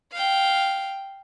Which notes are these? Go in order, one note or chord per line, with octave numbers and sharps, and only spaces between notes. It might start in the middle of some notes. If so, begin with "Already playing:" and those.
F5 G5